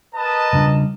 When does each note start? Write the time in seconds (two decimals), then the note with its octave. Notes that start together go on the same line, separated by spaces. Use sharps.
0.15 A#4 B4 D#5 A5
0.53 C#3 G3 D4